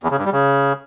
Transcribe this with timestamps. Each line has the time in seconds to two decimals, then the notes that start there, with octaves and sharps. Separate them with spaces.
0.03 E2
0.11 C#3
0.18 G2
0.25 G3
0.32 C#3